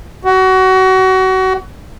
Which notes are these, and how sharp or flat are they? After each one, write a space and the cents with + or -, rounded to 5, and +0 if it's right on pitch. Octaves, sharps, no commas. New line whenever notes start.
F#4 +25